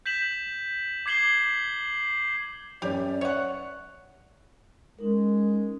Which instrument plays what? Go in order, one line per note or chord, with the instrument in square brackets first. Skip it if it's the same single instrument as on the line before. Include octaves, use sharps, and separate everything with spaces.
[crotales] G6 B6 E7 F#7
D6 G#6 C7 F#7 G7
[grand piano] F#2 C#4 [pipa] G4 [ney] D5
[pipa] C#5 F#5 [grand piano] E5
[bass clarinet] G#3 [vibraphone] C#4 D#4 A#4